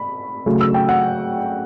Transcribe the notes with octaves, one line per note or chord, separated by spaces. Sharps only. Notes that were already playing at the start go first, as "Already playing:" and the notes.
Already playing: B5
C#3 F#3 A3
E6
G5
F#5